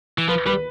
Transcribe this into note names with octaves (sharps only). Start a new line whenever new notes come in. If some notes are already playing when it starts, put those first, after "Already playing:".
E3
F3 B4
G3 B4